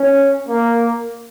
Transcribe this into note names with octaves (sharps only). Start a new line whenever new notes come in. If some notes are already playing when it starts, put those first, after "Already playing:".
Already playing: C#4
A#3